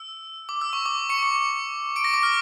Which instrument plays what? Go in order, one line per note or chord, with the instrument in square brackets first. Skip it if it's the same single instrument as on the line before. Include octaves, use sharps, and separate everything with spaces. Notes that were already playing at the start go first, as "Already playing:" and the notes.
Already playing: [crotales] E6
D6
E6
C#6
D6
C#6 C#7
C#6 C#7
D6 D7
A#6
D6
F6